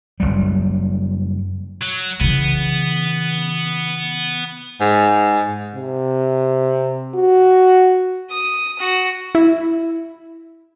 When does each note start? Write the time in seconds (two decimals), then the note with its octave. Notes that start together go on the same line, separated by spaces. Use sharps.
0.20 F#1 C#2 F#3 G3
1.82 F#3
2.21 C#3 E3 B3
4.81 G#2
5.75 C3
7.15 F#4
8.30 D#6
8.79 F#4
9.35 E4